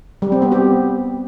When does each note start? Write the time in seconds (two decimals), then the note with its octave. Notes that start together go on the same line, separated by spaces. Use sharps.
0.22 G3
0.32 C4
0.42 B3
0.52 G4